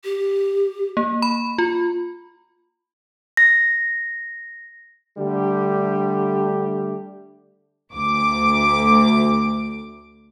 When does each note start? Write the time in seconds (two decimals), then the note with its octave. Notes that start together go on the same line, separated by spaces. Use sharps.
0.04 G4
0.97 A#3
1.22 B5
1.58 F4
3.37 A#6
5.18 D3 G3 A3 D4 G4
7.95 D2 D6